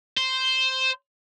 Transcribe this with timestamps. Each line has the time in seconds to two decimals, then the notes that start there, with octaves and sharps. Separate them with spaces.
0.17 C5